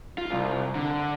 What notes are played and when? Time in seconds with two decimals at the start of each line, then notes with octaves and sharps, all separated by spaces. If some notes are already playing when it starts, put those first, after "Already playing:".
0.18 F4
0.30 C2
0.75 D3